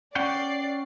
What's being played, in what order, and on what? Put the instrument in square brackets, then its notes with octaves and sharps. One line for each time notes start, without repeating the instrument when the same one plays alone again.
[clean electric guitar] C#4 F#5 G5 [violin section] D5 C7